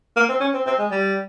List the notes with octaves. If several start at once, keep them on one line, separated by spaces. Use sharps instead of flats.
A#3
C4
C#4
C4
C4
G#3
G3